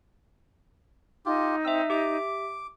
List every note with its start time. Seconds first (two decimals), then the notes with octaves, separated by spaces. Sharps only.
1.26 D#4 F4 G4
1.65 C4 E5 E6
1.90 G4 E5 D6